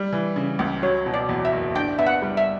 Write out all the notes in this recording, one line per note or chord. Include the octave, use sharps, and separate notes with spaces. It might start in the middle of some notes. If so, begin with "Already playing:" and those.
Already playing: G3
E3
C#3
C#2
F#3 C#5
B2
D5
E2
E5
F#1
D4 G5
B3 E5
F#5
G3
E5